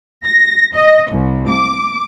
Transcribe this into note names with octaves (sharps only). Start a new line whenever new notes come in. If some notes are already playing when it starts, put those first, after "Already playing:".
A#6
D#5
C2
D6